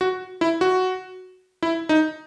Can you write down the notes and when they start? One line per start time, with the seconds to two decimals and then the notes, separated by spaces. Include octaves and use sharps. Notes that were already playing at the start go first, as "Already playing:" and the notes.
0.01 F#4
0.41 E4
0.61 F#4
1.63 E4
1.89 D#4